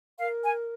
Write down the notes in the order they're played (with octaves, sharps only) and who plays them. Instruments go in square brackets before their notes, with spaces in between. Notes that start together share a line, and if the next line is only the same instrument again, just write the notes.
[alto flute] A#4 [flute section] F5
[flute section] G#5